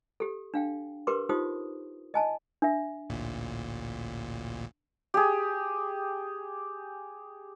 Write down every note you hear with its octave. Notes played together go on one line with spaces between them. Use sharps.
G4 A4
D4 F5 G5
G4 A#4 B4 C6 D6
D#4 F4 G4 C5 D#6
D#5 G#5 A5
D4 E5
A1 D2 A#2
G4 G#4